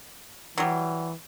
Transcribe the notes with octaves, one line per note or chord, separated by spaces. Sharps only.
E3 F#3 G3